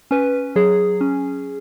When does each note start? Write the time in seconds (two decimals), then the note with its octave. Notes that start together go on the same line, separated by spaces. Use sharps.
0.11 C#4 B4
0.56 F#3 G#4
1.01 C#4